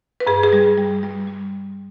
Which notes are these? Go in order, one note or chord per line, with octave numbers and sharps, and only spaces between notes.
B4
G2 G#4
G#4
G3
G3
G3
G3